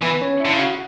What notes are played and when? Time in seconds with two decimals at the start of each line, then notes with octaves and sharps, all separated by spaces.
0.02 E3 B3 B4
0.21 C#4 C#5
0.40 D3 E4 E5
0.53 C#3
0.59 F#4 F#5